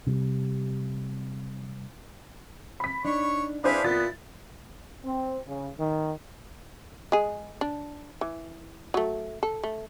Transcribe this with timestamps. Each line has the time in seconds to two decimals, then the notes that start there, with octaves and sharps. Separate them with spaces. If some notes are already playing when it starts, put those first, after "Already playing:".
0.07 C3 G3
2.80 B5 B6
3.05 D4 D#4 C#5 C#6
3.64 D4 E4 G#4 B4 C5 F5 B5
3.84 A#2 B3 E4 F4 A6
5.05 C4
5.47 C#3
5.79 D#3
7.12 G#3 G#4
7.61 D4
8.21 E3
8.94 F#3 A3
9.43 A4
9.63 A3